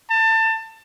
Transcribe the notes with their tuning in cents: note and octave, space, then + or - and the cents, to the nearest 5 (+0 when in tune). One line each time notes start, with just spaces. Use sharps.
A5 +25